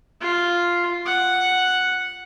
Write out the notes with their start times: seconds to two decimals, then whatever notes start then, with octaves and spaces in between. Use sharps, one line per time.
0.21 F4
1.05 F#5